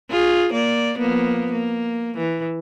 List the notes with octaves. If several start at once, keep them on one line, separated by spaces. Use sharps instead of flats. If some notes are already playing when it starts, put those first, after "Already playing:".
F4 G#4
A#3 D5
F3 A#3 B3
A#3
E3